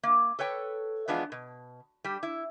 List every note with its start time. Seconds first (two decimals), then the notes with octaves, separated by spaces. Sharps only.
0.03 A#3
0.39 A4 B4 C#5 G5
1.08 E3 F3 G#3 B3 D4 F4
1.32 B2
2.04 G3 G4
2.23 E4